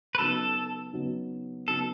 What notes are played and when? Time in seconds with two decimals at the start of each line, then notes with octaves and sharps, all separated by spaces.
0.15 B4
0.18 C#3 F#3 B3 D#4 A4
0.93 C#3 F#3 B3 D#4
1.68 C#3 F#3 B3 D#4 A4